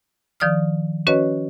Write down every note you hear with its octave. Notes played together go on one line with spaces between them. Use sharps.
D#3 F3 D5 D#6 F6
C#4 F#4 B4 C#5 D#5